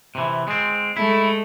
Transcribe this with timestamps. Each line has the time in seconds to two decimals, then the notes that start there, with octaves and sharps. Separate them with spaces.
0.15 C3 E3
0.48 G#3 C4
0.97 G#3 A3 E4